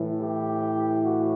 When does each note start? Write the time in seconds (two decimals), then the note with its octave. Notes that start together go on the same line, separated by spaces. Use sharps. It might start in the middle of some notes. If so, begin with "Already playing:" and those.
Already playing: A2 E3
0.20 G4
1.03 F#4